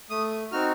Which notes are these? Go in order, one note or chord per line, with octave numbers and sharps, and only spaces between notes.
A3 D#6
C4 D#4 F#4 F6